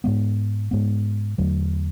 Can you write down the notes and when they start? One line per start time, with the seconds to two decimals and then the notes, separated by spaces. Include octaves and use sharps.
0.04 G#2 G#3 B3
0.71 G#2 G#3 B3
1.38 E2 D3 F#3 A3